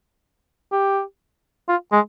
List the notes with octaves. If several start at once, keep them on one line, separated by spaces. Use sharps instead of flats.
G4
F4
G#3